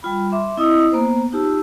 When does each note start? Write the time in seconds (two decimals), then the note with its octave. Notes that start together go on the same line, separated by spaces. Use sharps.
0.03 G3 F4 B5
0.32 E5 C6 D6
0.57 C4 E4 D#5 D#6 E6
0.92 A#3 B3 C5
1.32 D#4 F4 G4 A5 E6